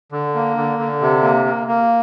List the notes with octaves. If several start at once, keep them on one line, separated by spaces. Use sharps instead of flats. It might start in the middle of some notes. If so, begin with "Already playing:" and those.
D3
A#3
D3
D3
C3
A#3
A#3
A#3